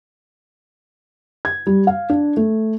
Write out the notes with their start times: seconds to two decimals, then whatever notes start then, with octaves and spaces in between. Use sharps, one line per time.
1.45 G#6
1.67 G3
1.87 F5
2.10 D4
2.37 A3